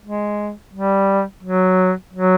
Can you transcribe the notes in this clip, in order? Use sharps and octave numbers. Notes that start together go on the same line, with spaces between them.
G#3
G3
F#3
F#3